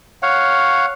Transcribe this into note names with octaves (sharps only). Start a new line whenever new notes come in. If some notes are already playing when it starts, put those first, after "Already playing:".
C#5 F5 F#5